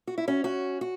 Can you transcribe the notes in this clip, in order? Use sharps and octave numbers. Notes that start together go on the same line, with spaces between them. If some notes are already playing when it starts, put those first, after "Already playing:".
F#4
E4
C#4 F#4
C#4 F#4
F#4